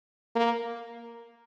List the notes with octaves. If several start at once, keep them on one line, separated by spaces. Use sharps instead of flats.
A#3